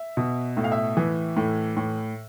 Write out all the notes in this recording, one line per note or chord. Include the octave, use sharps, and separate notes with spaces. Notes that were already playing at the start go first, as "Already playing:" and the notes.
Already playing: E5
B2
A2 E5
F5
E5
E3
A2
A2